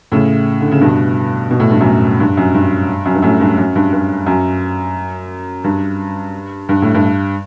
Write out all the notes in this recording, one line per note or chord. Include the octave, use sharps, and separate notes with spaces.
A2 C#3
D3
C#3
G2 B2
B2
A2
G2
F#2 A2
G2
F#2
G2
F#2
G2
F#2 A2
G2
F#2
G2
G2
F#2
G2
G2
A2
G2